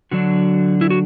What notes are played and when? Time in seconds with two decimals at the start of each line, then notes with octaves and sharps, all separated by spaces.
0.11 D3 F#3 D4 F#4
0.81 E4
0.90 F#4